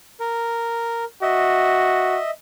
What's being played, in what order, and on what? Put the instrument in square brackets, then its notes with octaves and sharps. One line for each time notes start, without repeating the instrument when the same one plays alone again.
[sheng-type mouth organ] A#4
[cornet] F#4 [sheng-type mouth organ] D#5 E5